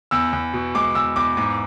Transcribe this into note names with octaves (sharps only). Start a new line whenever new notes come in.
E2 E6
E2
B2
G#3 D6
E2 E6
E2 D6
G#2 D6